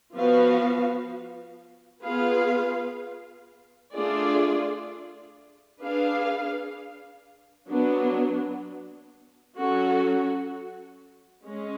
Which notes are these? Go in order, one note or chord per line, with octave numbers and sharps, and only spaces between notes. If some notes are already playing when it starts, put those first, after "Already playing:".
F3 B3 F#4 B4 F5
B3 F4 G#4 B4 F5
A3 D4 F4 G#4 D5
D4 G#4 B4 F5
F#3 B3 D4
F#3 C#4 F#4 A4
G#3 C#4